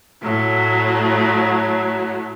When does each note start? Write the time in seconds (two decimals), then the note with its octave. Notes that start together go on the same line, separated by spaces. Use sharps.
0.22 A2 F#3